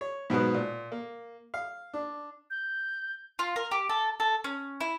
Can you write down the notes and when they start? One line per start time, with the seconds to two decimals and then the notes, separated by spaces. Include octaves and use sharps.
0.01 C#5
0.30 G#2 B2 F#3 B3
0.54 A#2
0.92 A#3
1.54 F5
1.93 D4
2.50 G6
3.39 F4
3.56 A#4
3.71 G4
3.89 A4
4.20 A4
4.44 C#4
4.81 E4